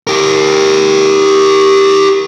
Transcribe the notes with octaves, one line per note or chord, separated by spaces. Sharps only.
G4 A#4